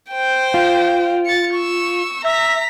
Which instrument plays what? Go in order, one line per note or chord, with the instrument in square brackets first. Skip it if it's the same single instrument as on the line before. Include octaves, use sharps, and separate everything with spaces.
[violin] C5 G5
[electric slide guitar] F4
[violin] A6 C#7
C#6 E6
[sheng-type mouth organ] E5 [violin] A#5 B6